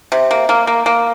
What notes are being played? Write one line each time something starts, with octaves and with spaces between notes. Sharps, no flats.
C3
A#3
A#3
A#3
A#3